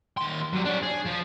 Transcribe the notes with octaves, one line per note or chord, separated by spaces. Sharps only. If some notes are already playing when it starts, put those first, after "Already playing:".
D#2 C6
F#3 G3
D4 C#5
G#4
F3